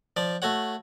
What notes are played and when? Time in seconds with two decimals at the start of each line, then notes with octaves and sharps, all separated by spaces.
0.17 F3 D5
0.42 A3 F#4 C#5 F#5